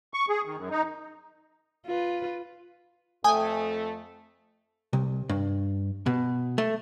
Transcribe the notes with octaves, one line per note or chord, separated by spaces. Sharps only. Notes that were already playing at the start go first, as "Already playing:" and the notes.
C#6
G#4
D#3
F#2
D#4
F4 B4
F2 A3 G5 G#5 D#6
C2
G2
B2
A3